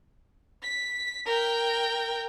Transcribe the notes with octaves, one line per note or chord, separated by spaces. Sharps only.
B6
A#4 G5